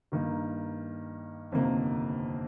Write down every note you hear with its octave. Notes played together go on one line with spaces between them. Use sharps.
G2 D#3 A#3
G1 F2 C3 D#3 A#3